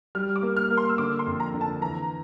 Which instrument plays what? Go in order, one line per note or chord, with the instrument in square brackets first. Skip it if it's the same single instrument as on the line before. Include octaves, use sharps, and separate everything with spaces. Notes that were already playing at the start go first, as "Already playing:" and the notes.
[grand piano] G3 [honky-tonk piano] F6
[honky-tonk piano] D6
[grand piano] A#3
[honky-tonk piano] F6
[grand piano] A#3
[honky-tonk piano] C6
E6
[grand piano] D3 [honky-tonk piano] D6
[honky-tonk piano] C6
[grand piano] F2
[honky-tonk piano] A#5
[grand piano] D3
[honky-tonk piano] A5
[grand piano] E3 [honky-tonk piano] A#5